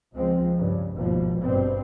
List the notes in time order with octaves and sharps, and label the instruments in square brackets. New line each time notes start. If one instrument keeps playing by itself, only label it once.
[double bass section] C#2 F3 G#3 C4
G2 C#3
G#1 D#2 B2 F3
G#1 G2 B2 C4